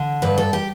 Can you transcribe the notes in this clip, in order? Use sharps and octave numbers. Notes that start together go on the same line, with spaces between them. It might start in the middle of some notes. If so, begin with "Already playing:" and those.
Already playing: D3
G2 B4
A4
G4